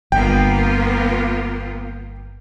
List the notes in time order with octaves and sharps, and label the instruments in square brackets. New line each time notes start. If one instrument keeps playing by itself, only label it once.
[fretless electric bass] G1 [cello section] A#3 B3 F4 [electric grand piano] G5